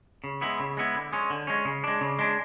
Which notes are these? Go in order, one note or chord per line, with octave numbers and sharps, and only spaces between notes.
C#3
G#3 B3 E4
C#3
G#3 B3 E4
D3
G#3 C#4
D3
G#3 C#4
C#3
G#3 D4
C#3
G#3 D4